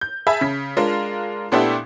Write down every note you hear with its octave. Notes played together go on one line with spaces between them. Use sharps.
G6
G#4 E5 G#5 A5 B5
C#3 B6
G#3 D4 F4 A#4
A#2 A3 B3 D4 E4 G4